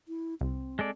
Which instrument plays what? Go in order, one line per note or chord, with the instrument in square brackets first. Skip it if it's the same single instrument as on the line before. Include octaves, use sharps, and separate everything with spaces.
[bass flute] E4
[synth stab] C2 [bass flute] C4
[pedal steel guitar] G#3 A4 D5